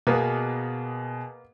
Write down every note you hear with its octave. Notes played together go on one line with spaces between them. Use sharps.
B2 A#3 B3 G#4 B4